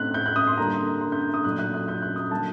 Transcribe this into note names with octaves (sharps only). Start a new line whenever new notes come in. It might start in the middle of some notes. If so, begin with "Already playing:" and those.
Already playing: A2 A3 C4 D#4 F#6
G6
F#6
D#6
C6
D3 G3 A#3 D4 A#5
C6
G6
D#6
A#2 F#3 A3 D#4 F#6
F#6
F#6
G6
F#6
D#6
D3 F#3 A#3 A5